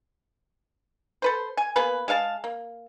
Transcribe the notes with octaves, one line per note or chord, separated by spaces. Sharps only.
A4 B4 C5
G#5
A#3 B3 G#4 B4
G#3 G#4 F5 A5
A#3